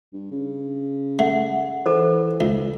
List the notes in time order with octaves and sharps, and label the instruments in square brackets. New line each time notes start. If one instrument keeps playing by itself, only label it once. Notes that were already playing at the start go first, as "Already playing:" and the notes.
[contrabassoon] G2
C#3
[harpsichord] A3 [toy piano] F#5
[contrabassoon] E3 [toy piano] A4 C5
[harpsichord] C#2